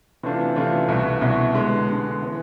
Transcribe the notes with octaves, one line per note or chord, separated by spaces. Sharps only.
C3 E3 A3 D4 F4
C3 E3 A3 D4 F4
C2 B2 B3 E4
C2 B2 B3 E4
D3 G#3 B3
D3 G#3 B3
E3 B3